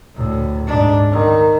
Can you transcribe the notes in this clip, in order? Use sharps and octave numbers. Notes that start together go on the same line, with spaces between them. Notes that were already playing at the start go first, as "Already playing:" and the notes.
D2 A2
G#2 D4
D#3